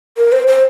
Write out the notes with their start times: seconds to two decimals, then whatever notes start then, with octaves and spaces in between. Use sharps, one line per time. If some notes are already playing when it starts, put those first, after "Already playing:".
0.17 A#4
0.32 C5
0.47 C5